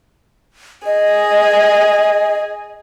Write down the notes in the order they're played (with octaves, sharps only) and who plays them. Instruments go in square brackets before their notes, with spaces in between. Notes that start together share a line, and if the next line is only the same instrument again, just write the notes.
[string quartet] G#4 [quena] D#5